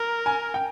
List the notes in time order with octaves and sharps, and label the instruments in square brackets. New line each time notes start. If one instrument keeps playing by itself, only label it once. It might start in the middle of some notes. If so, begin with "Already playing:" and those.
Already playing: [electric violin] A#4
[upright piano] G#5
G5